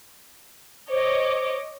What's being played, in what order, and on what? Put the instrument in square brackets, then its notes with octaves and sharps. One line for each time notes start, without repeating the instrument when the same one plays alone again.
[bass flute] C5 [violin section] C#5 D#5 D6